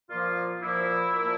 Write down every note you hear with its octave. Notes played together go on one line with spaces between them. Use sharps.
A#2 F3 A#3 F4
A#2 F3 A#3 E4
A#2 F3 A#3